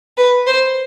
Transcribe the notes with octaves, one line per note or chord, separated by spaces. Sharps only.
B4
C5